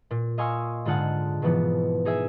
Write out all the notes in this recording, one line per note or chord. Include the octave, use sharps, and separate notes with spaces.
A#2
D#5 F5 G#5 C6 C#6 E6
G#2 D3 F4 G#4 F#5 A5
G#2 B2 E3 F3 B3
D#4 G#4 E5 G#5